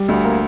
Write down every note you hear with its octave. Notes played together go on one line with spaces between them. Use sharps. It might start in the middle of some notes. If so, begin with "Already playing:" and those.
Already playing: G3
D2
A#3